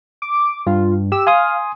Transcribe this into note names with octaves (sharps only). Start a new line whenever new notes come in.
D6
G2 F4
G4 E6
F5 G#5 C6 D#6